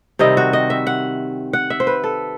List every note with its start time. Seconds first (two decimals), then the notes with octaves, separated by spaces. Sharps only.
0.19 C3 D#3 G3 C4 D#5
0.37 F#4
0.53 D#5
0.70 E5
0.87 F#5
1.53 F#5
1.70 E5
1.80 C5
1.87 B4
2.04 A4